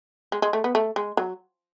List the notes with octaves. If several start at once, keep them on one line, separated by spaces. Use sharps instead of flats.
G#3
G#3
A3
B3
A3
G#3
F#3